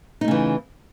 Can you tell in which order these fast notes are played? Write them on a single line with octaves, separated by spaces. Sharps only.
D#4 A3 C#3 E3